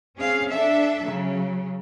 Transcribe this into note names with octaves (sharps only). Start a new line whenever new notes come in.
C4 C#4 G#4 F5
D4 A4 E5
C#3 F#3